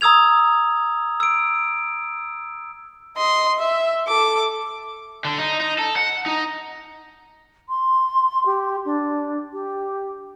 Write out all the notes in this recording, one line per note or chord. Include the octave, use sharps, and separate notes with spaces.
A#5 D#6 E6 G#6 F7
E6 D7
D#5 C6
E5
A4 D6
D3
D#4
D#4
A4
F#5
D#4
C6
G4
D4
G4